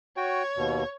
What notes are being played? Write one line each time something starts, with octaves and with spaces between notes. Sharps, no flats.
F#4 C#5 G5
D#2 B2